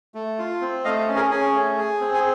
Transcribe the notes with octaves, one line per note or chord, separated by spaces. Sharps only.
A3
F4
C4
A3 D#5 F5
C#4
G#4 A#4
C#4 G#4
A3
G#4
C4
G#4